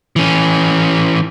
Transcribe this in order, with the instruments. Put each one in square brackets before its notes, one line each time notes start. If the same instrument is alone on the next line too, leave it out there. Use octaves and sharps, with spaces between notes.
[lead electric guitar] E3 C#4